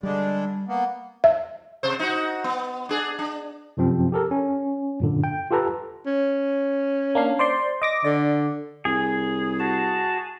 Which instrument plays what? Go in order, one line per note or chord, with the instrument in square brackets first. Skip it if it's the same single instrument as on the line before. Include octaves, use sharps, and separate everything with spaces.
[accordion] D3 G#3 D4 [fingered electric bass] G3
[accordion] A#3 B3
[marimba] E5
[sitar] C3 C5
D#4 F#4
B3
D4 G#4
D4
[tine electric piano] F#2 C3 F3 C4
G4 A4 A#4
C#4
F#2 A#2 D3
G5
F4 G4 A4 B4 A#5
[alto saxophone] C#4
[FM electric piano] A#3 D4 F5
C5 D5 C6
D#5 D6 A#6
[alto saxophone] D3 [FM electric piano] D5
[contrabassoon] C2 [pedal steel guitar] G#4
[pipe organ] F#4 A5